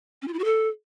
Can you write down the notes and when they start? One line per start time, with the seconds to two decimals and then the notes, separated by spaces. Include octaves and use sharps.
0.22 C#4
0.28 F4
0.33 E4
0.39 F#4
0.45 A4